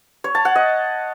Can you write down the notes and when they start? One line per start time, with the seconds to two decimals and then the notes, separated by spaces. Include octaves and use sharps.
0.24 C#5
0.35 A5
0.45 F#5
0.55 D#5